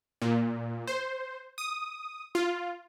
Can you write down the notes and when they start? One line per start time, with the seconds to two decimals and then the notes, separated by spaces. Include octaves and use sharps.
0.22 A#2
0.87 C5
1.58 D#6
2.35 F4